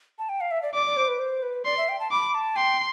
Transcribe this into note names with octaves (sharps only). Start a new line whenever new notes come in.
A5
G5
F5
E5
D5
D5 D6
D5
C5
B4
C5
B4
D5 C6
E5
G5
A5
B5 D6
A5
G5 C6